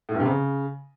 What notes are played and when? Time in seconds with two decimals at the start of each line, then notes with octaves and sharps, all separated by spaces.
0.09 A2
0.14 G2
0.20 C3
0.25 C#3